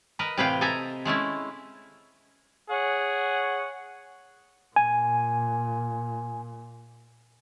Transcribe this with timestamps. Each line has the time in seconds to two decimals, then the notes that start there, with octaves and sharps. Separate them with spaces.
0.19 A#4 B4 D#5
0.37 A2 C3 E3 B4 F5 G5
0.61 A4 D#5 E5 G#5 A#5
1.05 G#3 A3 C#4 E4
2.70 G#4 C#5 F#5
4.76 A#2 G#5